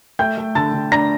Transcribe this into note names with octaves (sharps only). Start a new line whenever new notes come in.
A3 G5 G6
A3
D3 A5 A6
D3
D4 A#5 A#6